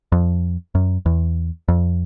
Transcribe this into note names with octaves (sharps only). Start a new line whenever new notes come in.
F2
F#2
E2
F2